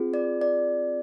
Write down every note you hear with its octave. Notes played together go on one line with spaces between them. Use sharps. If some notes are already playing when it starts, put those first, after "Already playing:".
Already playing: C4 F4 G#4
D5
D5